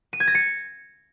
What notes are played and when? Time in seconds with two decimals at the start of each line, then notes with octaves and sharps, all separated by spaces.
0.13 D#7
0.20 G#6
0.27 A#6
0.35 C#7